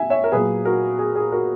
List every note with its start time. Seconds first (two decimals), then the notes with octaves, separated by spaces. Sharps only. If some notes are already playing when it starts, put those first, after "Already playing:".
Already playing: E5 G#5
0.10 C#5 E5
0.24 A#4
0.32 A#2 F#3 A#3 G#4 B4
0.65 F#4 A#4
0.99 G#4
1.15 G#4
1.32 F#4 A#4